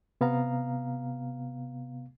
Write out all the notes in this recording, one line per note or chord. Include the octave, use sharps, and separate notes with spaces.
C3 B3 F5 A#5